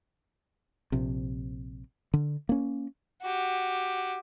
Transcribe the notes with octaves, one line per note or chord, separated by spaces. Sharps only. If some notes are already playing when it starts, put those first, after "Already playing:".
A#1 C3
D3
A#3 C#4
F#4 G4